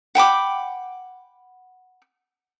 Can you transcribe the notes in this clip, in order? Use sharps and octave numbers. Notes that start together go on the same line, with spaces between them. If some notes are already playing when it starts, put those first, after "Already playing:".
F#5 G5 B5 D6